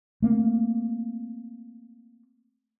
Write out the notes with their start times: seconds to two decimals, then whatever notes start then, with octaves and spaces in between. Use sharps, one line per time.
0.22 A3 A#3 C4